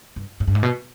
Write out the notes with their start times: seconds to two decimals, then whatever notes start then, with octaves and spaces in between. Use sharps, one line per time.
0.16 G2
0.40 G#2
0.47 G2
0.55 G#2
0.63 B2